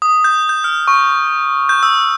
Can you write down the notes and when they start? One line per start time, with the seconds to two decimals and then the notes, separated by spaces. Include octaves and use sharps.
0.02 D#6
0.24 G6
0.49 G6
0.64 F6
0.88 C#6
1.69 G6
1.83 E6